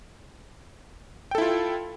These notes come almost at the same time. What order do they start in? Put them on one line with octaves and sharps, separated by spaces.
G5 A4 E4 F4